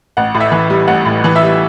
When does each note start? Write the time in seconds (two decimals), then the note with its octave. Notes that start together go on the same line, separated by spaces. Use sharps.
0.17 A1 F#5
0.34 A2
0.40 E5
0.52 E3
0.70 G3
0.88 A1 F#5
1.05 A2
1.24 E3
1.36 E5
1.42 G3